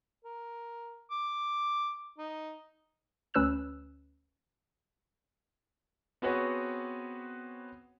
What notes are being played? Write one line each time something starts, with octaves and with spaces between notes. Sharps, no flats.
A#4
D6
D#4
D2 C#4 B4 E6 F#6 E7
B3 C4 F#4 G#4 B4 C#5